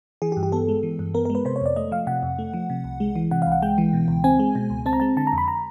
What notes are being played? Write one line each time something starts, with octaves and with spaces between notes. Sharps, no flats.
E3 G#4
G4
G2
G4
B3 A4
G#3
E3
G2
B3 A#4
A#4
G#3
B4
C3 C5
C#5
F2 D5
A3 D#5
F3 F5
C3 F#5
F2
A3
F3
C3
C2
G#3
E3
C3 F#5
F5
C2
F#5
G#3 G5
E3
B2
C#2
C4 G#5
G#3
B2
C#2
C4 A5
A#5
G#3 A5
D3 A5
A#5
F2
B5
A#5